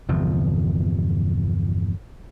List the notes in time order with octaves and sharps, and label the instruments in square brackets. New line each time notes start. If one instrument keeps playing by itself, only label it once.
[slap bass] G1 E2 C3 F3